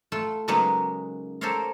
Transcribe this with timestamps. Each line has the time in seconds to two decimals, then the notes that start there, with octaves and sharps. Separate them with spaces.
0.12 A3 F4
0.48 C#3 F#3 G#3 A#3 B3 D#4
1.41 G4 A4 A#4 C5 C#5 F5